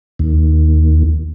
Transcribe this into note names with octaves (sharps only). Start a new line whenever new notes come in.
D#2